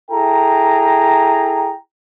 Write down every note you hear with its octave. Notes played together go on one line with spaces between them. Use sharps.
E4 G#4 A4 G5 A#5